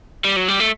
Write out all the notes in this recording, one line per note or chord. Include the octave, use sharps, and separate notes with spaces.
G3
F#3
G3
A3